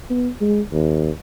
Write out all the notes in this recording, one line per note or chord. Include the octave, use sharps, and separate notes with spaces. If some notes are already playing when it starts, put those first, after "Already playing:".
B3
G#3
D#2